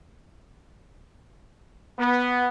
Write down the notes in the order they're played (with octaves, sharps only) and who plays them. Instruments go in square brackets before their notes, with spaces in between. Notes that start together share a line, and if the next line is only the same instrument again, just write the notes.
[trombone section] B3